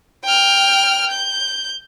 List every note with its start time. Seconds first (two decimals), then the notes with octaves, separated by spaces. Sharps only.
0.24 G5 F6
1.11 G6